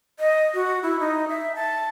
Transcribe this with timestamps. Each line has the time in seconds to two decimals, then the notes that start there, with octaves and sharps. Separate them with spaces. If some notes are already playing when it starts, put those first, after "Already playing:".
0.19 D#5
0.54 F#4
0.83 E4
0.99 D#4
1.28 E5
1.56 A5